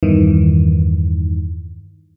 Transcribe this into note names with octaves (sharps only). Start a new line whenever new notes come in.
E2 G2 D#3 E3